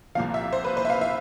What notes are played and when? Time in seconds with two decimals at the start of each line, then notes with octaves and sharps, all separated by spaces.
0.15 C2 A#2 F3 F5
0.34 E5
0.53 C5
0.65 B4
0.77 C5
0.85 E5
0.90 F5
1.01 E5